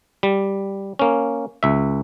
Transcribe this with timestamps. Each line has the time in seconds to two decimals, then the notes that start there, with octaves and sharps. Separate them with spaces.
0.23 G3
0.99 A#3 C#4
1.63 C#2 E5